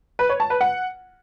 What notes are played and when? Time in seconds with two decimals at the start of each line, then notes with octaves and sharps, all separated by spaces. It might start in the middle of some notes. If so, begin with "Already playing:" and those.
0.19 B4
0.29 C#5
0.40 A5
0.50 B4
0.61 F#5